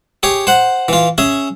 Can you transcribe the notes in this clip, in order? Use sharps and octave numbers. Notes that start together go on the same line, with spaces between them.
G4 G#4 C#5
C5 F#5
E3 F4
C#4 G#4 E5